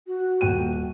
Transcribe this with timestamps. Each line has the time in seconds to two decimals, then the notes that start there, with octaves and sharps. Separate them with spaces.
0.07 F#4
0.41 D#1 G5 D#7